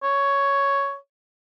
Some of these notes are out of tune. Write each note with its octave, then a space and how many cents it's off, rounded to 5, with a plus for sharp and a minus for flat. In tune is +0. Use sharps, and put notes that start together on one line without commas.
C#5 +5